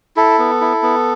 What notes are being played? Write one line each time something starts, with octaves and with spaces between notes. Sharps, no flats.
E4 A4
B3
E4
B3